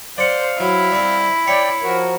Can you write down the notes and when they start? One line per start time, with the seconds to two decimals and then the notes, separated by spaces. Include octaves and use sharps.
0.18 C5 D5 F5 F#5
0.60 F#3 E4
0.92 G3 C4
1.47 C#5 D5 G5
1.83 F3 F#4 A#4